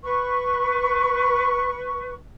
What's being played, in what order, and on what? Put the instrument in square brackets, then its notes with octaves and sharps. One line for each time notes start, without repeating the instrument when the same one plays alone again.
[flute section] B4 C#6